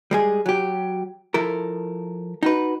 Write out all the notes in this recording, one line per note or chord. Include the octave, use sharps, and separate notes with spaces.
G3 G#3 G#4
F#3 G4
F3 E4 A4 A#4
D#4 F#4 B4